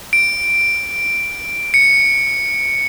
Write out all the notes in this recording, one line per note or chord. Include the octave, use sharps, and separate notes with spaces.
D7
C#7